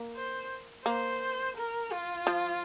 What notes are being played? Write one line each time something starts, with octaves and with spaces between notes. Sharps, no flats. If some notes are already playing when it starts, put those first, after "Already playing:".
Already playing: A#3
C5
A#3 C5
A#4
F4
F3